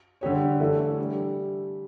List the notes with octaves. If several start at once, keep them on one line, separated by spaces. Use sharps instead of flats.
D3 G3 D4 G4 C#5
E3 A3 D4 A4 E5
G3 D4 G4